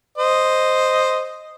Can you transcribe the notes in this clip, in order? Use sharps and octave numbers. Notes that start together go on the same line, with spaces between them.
C5 D#5